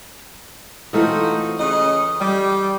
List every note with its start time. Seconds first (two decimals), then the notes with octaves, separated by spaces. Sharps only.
0.93 E3 A3 C4 D#4 F4 F#4
1.59 C#3 D#5
2.20 G3